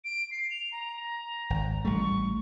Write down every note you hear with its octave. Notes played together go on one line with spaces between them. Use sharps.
D7
C7
F7
A#5
G#1
A1 G3 A3 C#6